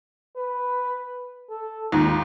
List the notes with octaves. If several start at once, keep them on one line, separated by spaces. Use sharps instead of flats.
B4
A4
D#2 G#2 F4